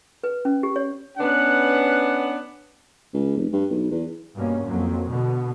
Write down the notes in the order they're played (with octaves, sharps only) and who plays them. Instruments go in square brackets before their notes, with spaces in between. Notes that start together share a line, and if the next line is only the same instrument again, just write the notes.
[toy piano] B4
C#4
G4
C#5
[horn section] B3 C#4 D4 B4 F#5
[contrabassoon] C#2
F1
G2
B1
E2
[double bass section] G2 B2 A#3 C#4
F2 F#3 A#3
B2 D3 B3